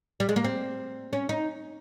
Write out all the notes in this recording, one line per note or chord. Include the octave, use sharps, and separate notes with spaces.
G3
G#3
A#3
C4
C#4
D#4